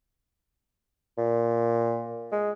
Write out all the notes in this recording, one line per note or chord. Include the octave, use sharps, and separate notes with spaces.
A#2
G#3